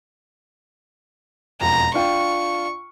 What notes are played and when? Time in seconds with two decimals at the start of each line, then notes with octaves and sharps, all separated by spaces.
1.61 E1 F2 A#5
1.94 D4 F4 G5 C#6